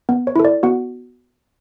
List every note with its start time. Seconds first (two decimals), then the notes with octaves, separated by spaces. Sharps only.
0.09 B3
0.27 C#5
0.36 E4 A4
0.45 D5
0.63 B3 F#4 F#5